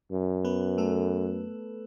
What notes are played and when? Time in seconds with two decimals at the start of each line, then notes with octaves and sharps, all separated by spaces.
0.11 F#2
0.44 B3 B4
0.78 A3 A4